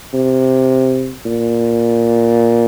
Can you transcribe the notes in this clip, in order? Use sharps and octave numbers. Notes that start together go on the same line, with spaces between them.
C3
A#2